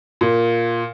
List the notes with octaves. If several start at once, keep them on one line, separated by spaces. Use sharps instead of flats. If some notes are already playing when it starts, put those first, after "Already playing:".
A#2